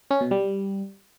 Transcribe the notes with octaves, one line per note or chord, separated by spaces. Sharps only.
C#4
B2
G3